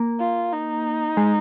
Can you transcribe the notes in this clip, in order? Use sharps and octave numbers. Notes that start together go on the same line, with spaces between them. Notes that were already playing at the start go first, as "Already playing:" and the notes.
Already playing: A#3
F4
D#4
G#3